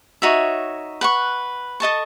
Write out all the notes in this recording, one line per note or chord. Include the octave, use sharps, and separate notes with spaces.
D#4 F#4 C#5 E5
B4 F#5 C#6
A4 D#5 A5 C#6